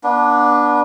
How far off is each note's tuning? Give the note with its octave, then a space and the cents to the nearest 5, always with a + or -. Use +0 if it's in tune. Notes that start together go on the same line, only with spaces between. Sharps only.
B3 -35 D4 +0 B4 -30